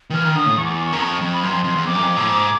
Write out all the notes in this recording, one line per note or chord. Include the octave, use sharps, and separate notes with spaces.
D#3
E3 F6
D#3
D3 D#6
A2
E2 C#6
D6
C#6
D6
C#6
F#2
F2 C#6
F2
B5
F#2 C6
F2
F2
E2
F2 D6
F#2
F2
A2
G#2